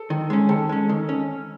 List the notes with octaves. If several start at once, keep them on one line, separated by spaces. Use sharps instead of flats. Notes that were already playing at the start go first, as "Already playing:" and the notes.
Already playing: A4
D#3
G#3 C#4
D#3 A4
G#3 C#4
D#3
C#4